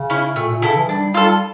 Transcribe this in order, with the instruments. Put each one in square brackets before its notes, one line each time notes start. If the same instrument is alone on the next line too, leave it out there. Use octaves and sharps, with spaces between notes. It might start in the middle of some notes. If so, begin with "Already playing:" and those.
Already playing: [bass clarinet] C#3
[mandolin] C#4 E4
[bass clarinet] A#2 [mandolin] A3
[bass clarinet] A#2
[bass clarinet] C#3 [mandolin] E4 A4
[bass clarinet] E3
[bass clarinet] G3 [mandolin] D4
[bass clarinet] G3 [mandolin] F4 A4